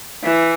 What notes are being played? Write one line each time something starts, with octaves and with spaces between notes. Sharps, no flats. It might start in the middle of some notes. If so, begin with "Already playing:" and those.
E3